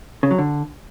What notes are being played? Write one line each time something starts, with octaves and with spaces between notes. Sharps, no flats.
C#3
F#3
D3